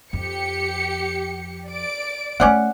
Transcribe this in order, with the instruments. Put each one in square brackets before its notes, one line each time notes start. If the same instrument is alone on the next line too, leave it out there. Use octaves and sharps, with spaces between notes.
[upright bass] F2 [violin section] G4 C#7
[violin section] D5 D7
[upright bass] A3 A#3 [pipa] C#4 D5 F#5